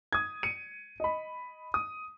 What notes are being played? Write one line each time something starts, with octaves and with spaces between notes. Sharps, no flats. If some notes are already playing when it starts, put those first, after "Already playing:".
D#6 G#6
C#7 D#7
D#5 B5
D#6